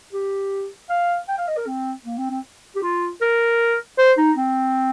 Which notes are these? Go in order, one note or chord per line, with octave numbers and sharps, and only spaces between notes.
G4
F5
G5
F5
D#5
A#4
C4
A#3
C4
C4
G4
F4
A#4
C5
D#4
C4